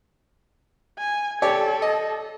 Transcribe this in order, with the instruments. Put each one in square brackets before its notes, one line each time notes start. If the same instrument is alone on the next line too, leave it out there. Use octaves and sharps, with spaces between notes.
[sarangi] G#5
[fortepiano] G4 C#5 D5 [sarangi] A4
[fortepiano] D#5